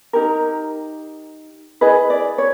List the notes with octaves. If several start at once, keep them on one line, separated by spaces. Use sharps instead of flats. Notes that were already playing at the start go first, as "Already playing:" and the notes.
D#4 G4 A#4
E4 G#4 B4 D#5
D5
C#5